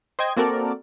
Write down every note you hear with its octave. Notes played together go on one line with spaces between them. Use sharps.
C5 D#5 G5 G#6
A#3 C4 F#4 A4 A#4 D5